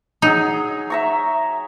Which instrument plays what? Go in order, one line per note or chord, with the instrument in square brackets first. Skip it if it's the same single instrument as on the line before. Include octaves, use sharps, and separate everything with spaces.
[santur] F#3 G#4 [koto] D#4
[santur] E5 A#5 C#6